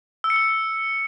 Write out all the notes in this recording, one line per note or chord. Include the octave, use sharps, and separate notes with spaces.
E6
C#7
E6